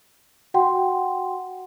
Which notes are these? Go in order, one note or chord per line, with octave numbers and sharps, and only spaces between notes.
F#4 F#5 G5 C6